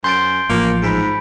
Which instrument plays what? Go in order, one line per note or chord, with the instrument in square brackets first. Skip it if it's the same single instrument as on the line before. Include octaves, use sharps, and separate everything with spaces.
[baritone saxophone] F#2 [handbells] C6 [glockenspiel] G6 A6 D7
[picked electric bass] A1 F3 [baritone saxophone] A#3 [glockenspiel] C#7
[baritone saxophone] G#2 [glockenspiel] B5 B6 D7